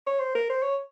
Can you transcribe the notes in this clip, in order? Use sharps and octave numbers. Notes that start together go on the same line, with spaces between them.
C#5
C5
A#4
C5
C#5